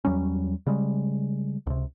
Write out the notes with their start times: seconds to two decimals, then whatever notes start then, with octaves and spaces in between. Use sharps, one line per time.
0.05 E2 F#3 G3 C#4
0.67 C#3 G3 G#3
1.67 C#2 C3